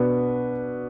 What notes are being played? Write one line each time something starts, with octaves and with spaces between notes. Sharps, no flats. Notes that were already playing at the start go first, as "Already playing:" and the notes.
Already playing: B2 B3 D4